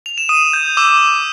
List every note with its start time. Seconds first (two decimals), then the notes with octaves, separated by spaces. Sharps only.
0.06 F7
0.18 E7
0.29 D#6 D#7
0.53 G6
0.77 D6 E6 E7